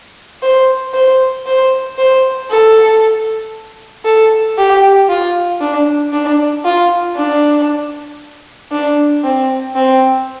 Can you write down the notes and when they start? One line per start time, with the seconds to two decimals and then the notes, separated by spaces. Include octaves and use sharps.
0.42 C5
0.94 C5
1.46 C5
1.98 C5
2.50 A4
4.05 A4
4.58 G4
5.09 F4
5.61 D4
6.13 D4
6.65 F4
7.17 D4
8.72 D4
9.24 C4
9.75 C4